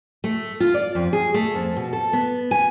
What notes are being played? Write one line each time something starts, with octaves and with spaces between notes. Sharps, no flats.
A3
F4
D5
F2
G#4
A3
F2
B2
A4
B3
G#5